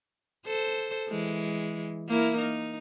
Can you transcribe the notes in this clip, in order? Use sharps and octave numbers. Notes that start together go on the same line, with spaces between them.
A4 C5
E3 G#3
A#3 E4 A#4
D#4